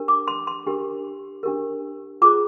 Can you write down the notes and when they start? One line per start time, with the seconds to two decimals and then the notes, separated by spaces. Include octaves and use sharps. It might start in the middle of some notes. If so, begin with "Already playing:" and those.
Already playing: D4 G4 A#4
0.08 D6
0.28 C6
0.47 C6
0.66 D4 G4 A#4
1.43 D4 G4 A#4
2.22 F4 G#4 C5 D6